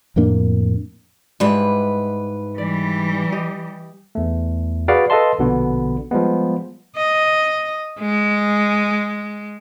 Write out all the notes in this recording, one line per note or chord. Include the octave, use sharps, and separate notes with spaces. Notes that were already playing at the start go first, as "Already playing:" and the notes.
F2 A2 A#3 D4
G#2 G3 D4 E4 B4
E3 G3 D5
G4 D#5
E2 A3
F#4 G#4 B4 D5 F5 F#5
A4 B4 D#5 F5 A5 C6
A#1 B2 D3 B3
F3 G3 G#3 B3
D#5
G#3